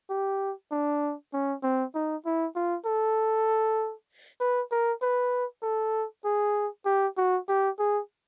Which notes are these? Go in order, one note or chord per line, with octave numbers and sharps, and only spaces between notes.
G4
D4
C#4
C4
D#4
E4
F4
A4
B4
A#4
B4
A4
G#4
G4
F#4
G4
G#4